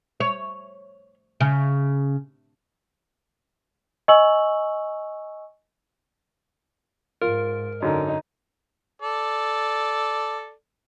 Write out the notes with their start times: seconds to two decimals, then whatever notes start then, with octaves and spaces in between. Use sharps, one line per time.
0.20 C#5
1.41 C#3
4.08 D#5 G#5 C#6 E6 F#7
7.21 G#2 F4 A#4
7.82 F#2 D3 D#4
9.02 A4 D5